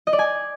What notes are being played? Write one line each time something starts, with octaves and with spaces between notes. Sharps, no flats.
D#5
D5
G#5